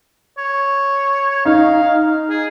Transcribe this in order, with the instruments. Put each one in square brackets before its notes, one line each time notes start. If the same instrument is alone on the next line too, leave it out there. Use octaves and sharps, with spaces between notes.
[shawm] C#5
[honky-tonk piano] D#4 [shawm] F5
[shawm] G#4